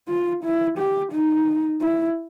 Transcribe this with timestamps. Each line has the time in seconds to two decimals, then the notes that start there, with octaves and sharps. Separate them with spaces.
0.08 F4
0.44 E4
0.78 G4
1.13 D#4
1.81 E4